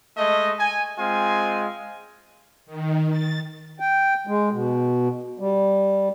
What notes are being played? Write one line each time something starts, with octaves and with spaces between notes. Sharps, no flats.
G#3 A3 D#5
G#5
G#3 C4 F4 G#5
D#3
A6
G5
G#3
B2
G3